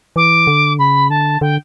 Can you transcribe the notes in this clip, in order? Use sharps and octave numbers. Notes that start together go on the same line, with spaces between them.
E3 D6
D3
C#3 B5
D3 A5
D3 G5